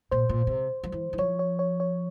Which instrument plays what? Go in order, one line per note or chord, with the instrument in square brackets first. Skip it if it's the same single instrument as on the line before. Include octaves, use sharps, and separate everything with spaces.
[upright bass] A#2 [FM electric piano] C5
[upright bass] A#2
C3
F3
E3
E3
[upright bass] F3 [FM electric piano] C#5
[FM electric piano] C#5
C#5
C#5